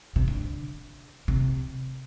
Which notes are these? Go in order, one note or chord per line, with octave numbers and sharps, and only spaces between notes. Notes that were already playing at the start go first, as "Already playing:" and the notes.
C3
D3
C3